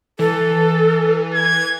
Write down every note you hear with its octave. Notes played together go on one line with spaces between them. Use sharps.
E3 A4
G#6